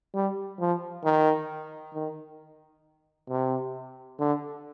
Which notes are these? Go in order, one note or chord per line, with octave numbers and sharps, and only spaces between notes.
G3
F3
D#3
D#3
C3
D3